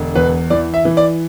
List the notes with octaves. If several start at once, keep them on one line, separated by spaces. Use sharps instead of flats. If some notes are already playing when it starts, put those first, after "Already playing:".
Already playing: E1 D3
E2 B4
E3 D5
E5
E3
D5